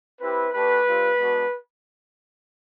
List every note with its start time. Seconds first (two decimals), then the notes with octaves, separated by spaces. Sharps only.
0.20 C4 E4 G4 B4
0.53 A3 D4 G4 B4
0.86 G3 C4 F4
1.18 G#3 B3 D4 F#4